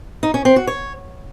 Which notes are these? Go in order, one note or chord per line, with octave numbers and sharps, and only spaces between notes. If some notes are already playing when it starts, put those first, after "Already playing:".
D#4
C#4
C4
F#4
C#5